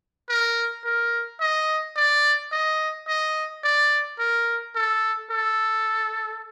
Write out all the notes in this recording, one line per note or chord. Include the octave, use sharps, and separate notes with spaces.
A#4
A#4
D#5
D5
D#5
D#5
D5
A#4
A4
A4